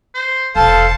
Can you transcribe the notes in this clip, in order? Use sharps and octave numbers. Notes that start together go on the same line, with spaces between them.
C5
E1 A4 C5 F5 A5